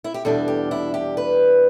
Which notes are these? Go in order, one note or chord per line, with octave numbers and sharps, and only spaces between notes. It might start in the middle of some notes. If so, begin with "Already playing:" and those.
E4
G4
E2 B2 G3 D4 A4
G4
E4
G4
B4